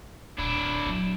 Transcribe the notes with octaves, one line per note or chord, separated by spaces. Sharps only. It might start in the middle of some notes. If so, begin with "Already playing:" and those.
D#1 D4 E4
F#3